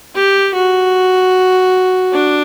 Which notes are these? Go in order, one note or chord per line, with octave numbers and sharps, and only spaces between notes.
G4
F#4
D4